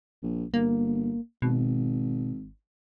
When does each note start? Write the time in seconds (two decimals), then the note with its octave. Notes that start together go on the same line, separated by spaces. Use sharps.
0.23 A#1
0.54 G1 A#3
1.42 G#1 B2